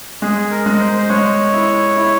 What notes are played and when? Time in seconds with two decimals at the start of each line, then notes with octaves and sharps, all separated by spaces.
0.22 G#3 G#4
0.51 A#4
0.66 G#3
0.80 C5
0.98 C5
1.09 G#3 C#5
1.53 E4
1.97 E4